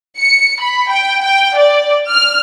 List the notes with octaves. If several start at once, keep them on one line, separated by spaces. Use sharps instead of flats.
C#7
B5
G5
G5
D5
F6